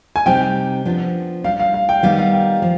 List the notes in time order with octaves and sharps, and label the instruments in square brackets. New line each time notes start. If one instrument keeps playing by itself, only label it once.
[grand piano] G#5
[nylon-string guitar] C3 G3 C4 D#4 G4 [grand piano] G5
[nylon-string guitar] F3 B3 D4 F4
[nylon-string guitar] G3 D4 G4 [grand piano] F5
[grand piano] F5
F5
G5
[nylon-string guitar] D#3 G3 B3 D#4 [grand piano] F5
[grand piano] F5
G5
[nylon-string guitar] F3